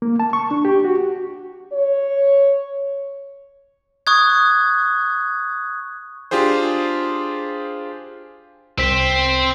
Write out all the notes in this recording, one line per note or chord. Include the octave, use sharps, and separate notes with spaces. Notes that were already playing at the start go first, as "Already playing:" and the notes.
A#3
A5
C#6
D4
G4
F#4
C#5
C#6 D#6 F#6 G#6
D4 F4 G4 G#4 C5
C2 C4 C5 B6